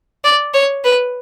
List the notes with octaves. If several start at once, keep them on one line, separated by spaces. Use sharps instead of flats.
D5
C#5
B4